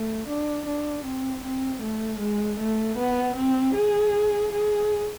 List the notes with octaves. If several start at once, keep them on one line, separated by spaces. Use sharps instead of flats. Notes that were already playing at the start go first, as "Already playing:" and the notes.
Already playing: A3
D4
D4
C4
C4
A3
G#3
A3
B3
C4
G#4
G#4